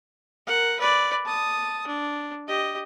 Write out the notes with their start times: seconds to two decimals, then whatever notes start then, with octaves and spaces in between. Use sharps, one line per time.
0.46 A#4 F#5
0.79 B4 D5
1.25 A5 D#6
1.87 D4
2.47 G4 D#5